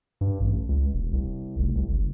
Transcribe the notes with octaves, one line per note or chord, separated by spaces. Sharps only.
G2
A1
C#2
E1
C2
F1
C2
F#1